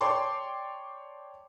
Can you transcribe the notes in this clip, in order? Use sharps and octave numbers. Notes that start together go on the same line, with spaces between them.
C#5 D5 G5 A5 C6 D6